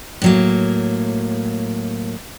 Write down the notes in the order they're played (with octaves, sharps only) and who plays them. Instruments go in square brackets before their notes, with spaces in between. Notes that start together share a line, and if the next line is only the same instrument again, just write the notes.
[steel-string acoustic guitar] A2 F#3 A#3